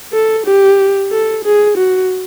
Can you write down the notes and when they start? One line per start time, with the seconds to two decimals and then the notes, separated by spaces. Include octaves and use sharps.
0.13 A4
0.46 G4
1.11 A4
1.44 G#4
1.78 F#4